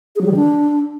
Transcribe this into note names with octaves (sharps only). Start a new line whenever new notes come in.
G#4
F#3
G3
D#3
D4